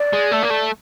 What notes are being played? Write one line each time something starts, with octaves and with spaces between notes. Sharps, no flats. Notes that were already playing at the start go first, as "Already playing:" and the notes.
Already playing: D5
G#3
A3
A#3
A3